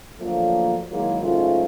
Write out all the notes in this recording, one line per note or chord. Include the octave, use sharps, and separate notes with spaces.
D3 F3 F#3 A3 A#3
D#3 F#3 G#3 A#3 D#4 E4
G#2 C#3 F#3 A3 F4